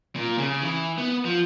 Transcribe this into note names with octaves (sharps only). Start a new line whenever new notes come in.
A#2
C#3
E3
B3
F3